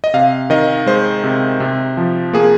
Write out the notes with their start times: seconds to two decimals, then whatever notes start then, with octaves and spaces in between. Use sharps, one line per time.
0.04 D#5
0.14 C3 F5
0.50 D#3 D#5
0.87 G#3 C5
1.24 C3
1.60 C3
1.97 F3
2.33 A#3 G#4